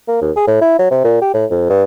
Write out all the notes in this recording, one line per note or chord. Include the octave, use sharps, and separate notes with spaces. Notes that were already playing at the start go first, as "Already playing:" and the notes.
A#3
D#2
G#4
A2
E4
F#3
C3
A#2
G4
A2
F2
G2